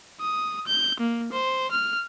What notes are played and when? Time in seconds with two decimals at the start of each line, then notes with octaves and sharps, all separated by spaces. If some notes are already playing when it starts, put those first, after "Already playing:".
0.21 D#6
0.67 G6
1.00 A#3
1.32 C5
1.71 F6